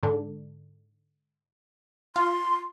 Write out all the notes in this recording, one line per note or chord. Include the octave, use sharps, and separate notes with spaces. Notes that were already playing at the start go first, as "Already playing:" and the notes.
G#2 D3 D4
F4 C6